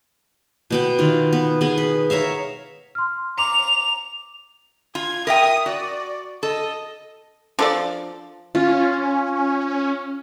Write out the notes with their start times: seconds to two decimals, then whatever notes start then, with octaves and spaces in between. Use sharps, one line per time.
0.70 B2 B3 G5
0.99 D#3 F4
1.33 B3
1.61 B3 G#4
1.78 B4
2.10 A#4 C#5 E5 F5
2.95 C6 F6
3.38 A#5 D6 F7
4.95 F4 G#6
5.27 A#4 E5 G5 D#6
5.66 F#4 D5
6.43 A4 D#5
7.59 F3 D4 A4 D5
8.55 C#4 F4